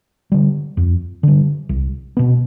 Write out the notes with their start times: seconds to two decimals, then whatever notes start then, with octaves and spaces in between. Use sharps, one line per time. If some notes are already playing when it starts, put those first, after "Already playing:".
0.32 D3 G3
0.77 F2
1.23 D3 G3
1.69 C2
2.17 B2 B3